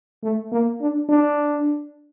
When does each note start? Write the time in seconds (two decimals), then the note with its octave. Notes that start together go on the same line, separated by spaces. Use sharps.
0.23 A3
0.52 A#3
0.81 D4
1.09 D4